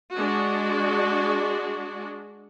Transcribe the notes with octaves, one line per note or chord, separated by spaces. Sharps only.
G#3 D4 F#4